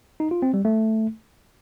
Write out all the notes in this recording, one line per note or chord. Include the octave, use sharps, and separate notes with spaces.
D#4
F4
C4
G3
A3